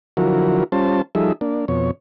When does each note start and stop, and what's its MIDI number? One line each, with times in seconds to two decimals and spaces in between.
0.17 0.64 50
0.17 0.64 53
0.17 0.64 54
0.17 0.64 64
0.17 0.64 66
0.17 0.64 70
0.72 1.02 55
0.72 1.02 61
0.72 1.02 65
0.72 1.02 72
0.72 1.02 81
1.15 1.32 53
1.15 1.32 55
1.15 1.32 63
1.15 1.32 68
1.15 1.32 69
1.15 1.32 76
1.41 1.65 58
1.41 1.65 62
1.68 1.91 41
1.68 1.91 47
1.68 1.91 73